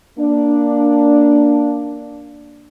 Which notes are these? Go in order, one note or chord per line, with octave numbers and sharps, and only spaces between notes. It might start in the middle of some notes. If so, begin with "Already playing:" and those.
A#3 D4